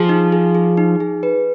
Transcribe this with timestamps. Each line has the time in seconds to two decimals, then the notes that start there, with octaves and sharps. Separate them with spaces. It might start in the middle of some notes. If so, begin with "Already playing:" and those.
Already playing: F3 G#4
0.09 D#4
0.32 G#4
0.55 G#4
0.77 D#4
1.00 G#4
1.23 B4